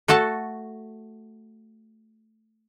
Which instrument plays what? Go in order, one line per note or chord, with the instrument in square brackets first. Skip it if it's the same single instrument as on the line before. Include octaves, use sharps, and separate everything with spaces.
[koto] A3 F#4 A4 A5